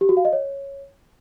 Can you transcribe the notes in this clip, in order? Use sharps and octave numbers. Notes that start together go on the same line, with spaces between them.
G4
F#4
F5
D#5
C#5